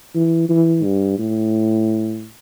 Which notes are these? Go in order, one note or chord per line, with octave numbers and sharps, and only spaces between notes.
E3
E3
G2
A2